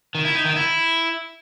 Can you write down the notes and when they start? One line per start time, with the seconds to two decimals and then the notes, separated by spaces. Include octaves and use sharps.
0.15 D#3
0.25 E4
0.35 D#4
0.45 D#3
0.55 E4